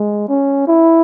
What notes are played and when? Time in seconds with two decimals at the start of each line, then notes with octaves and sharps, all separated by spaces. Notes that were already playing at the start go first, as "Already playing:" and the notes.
Already playing: G#3
0.29 C#4
0.68 E4